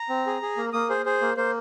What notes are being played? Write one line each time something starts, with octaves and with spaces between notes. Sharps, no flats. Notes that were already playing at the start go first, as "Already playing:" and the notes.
Already playing: A#5
C4
G#4
G#4
A#3
A#3 D#6
G#4 C5
G#4 C5
A#3
A#3 C5